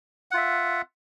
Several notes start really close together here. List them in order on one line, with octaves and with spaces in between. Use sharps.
F#5 F4 E5